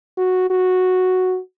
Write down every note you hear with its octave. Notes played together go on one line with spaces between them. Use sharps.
F#4
F#4